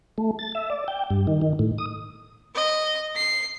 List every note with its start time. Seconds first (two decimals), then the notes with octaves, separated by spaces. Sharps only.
0.18 A3
0.39 A6
0.55 E5
0.70 D5
0.88 G5
1.10 G2
1.27 D#3
1.42 D#3
1.59 A2
1.78 D#6
2.55 D#5
3.16 C7